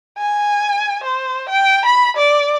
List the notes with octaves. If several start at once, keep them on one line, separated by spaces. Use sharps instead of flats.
G#5
C5
G5
B5
D5